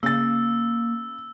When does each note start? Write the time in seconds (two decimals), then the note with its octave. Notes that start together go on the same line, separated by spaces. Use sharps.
0.03 C#3 A#3 E6 A6